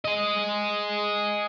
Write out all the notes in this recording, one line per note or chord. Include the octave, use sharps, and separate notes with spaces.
G#4 D#5